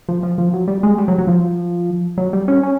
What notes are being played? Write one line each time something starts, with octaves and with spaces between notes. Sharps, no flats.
F3
F3
F3
F#3
G3
G#3
G3
F#3
F#3
F3
F#3
G3
C#4
C#4